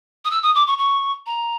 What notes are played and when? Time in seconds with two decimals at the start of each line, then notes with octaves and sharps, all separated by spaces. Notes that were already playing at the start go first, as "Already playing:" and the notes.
0.25 D#6
0.30 E6
0.43 D#6
0.55 D6
0.67 C#6
0.78 C#6
1.26 A#5